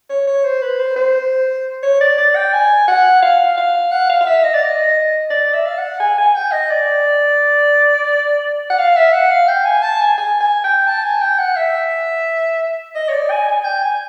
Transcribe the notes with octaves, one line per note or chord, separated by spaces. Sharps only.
C#5
C#5
C5
B4
C5
C5
C#5
D5
D5
G5
G#5
F#5
F5
F5
F#5
F5
F5
E5
D#5
D5
D#5
D5
E5
F5
F#5
G#5
G#5
G5
D#5
D5
F#5
F5
E5
F#5
F5
G5
G#5
A5
G#5
G#5
G#5
G5
A5
G#5
G5
F#5
E5
D#5
C#5
D5
G#5
G#5
G5
G#5